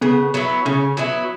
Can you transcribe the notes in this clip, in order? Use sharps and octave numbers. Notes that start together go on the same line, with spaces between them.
C#3 B3
F#3 B3 E4
C#3 C#4
F#3 B3 E4